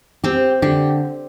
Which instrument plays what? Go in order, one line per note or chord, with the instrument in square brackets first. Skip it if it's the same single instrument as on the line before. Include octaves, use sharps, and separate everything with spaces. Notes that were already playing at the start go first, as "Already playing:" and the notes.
[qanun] C4 [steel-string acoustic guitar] G4
[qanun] D3 [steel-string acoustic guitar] G4